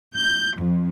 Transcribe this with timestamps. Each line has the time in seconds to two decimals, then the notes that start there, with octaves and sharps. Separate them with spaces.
0.15 G6
0.59 F2